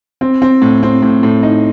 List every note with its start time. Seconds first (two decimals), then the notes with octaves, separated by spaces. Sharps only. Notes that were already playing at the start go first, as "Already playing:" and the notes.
0.21 C4
0.42 C4
0.62 A2
0.83 C4
1.02 A2
1.23 A2
1.43 D#4